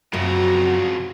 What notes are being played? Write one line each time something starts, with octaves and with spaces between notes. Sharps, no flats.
F#2 C#3 F3 C4 F#4 A#5